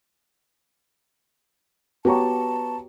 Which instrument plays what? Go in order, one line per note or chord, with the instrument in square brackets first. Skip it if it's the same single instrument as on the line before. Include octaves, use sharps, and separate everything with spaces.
[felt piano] B3 A#5 C#6 [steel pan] F#4 G4 C#5 [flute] A5